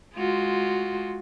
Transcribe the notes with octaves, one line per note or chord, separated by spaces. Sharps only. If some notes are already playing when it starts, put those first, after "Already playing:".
G#3 F4 F#4